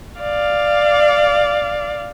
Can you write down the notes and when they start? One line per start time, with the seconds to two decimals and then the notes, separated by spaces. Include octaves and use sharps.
0.20 D5 F5